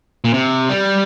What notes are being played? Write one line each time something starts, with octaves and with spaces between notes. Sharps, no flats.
A#2
C3
G3